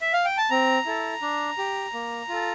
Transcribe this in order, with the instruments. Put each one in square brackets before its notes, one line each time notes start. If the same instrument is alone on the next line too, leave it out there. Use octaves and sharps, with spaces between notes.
[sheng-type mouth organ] E5
F5
G5
A5
C4 A#5
E4 A4
D4
G4
A#3
F4 A4